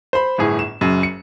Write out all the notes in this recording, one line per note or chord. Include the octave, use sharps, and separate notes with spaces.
C5 B5
G1 A2 G#4
E7
F#1 F#2
C#7